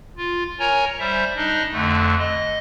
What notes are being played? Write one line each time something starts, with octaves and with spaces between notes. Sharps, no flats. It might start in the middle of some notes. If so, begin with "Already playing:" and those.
F4
A#4 C#5 G#5 A#5
G3 C5 E5
D4 D#4 D#5
F2 D3 A3
D#5